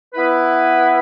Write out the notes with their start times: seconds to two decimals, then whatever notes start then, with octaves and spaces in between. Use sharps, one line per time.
0.15 B3 E4 B4